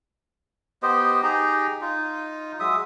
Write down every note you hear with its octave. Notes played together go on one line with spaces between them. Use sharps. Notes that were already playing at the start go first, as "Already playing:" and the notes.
B3 G4 C5 D#5
D#4 G4 G#4 A#5
D#4 F4
F#3 G#3 E5 D#6